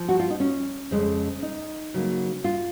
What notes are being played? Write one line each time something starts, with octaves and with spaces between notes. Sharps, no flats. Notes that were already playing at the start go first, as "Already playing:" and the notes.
Already playing: F3
F#4
F4
D#4
C#4
F2 C#3 G#3
D#4
C#3 F#3 A#3
F4